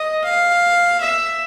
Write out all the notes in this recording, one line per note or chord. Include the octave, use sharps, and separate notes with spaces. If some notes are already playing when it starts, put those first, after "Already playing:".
Already playing: D#5
F5
E5